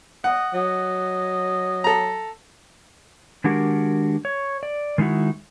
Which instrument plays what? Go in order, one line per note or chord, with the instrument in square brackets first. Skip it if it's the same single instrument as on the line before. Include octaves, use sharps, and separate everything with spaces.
[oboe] D#5 [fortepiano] F#5
[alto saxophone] F#3 [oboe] D#5
[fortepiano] A4 A#5
[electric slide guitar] D#3 G#3 D4 F#4 G4 A#4
C#5
D5
D#3 G#3 D#4 E4 F#4